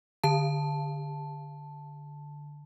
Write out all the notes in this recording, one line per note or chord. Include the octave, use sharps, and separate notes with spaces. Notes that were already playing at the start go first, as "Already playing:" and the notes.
D3 A5